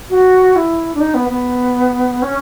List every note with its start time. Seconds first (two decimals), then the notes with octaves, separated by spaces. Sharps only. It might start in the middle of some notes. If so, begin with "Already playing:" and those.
0.10 F#4
0.56 E4
0.95 D4
1.01 D#4
1.14 B3
1.29 B3
2.22 C#4